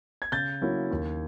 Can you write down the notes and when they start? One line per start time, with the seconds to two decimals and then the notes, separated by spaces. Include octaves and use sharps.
0.22 G#6
0.32 C#3 G6 A6
0.61 F#3 A#3 C#4 E4
0.91 D#2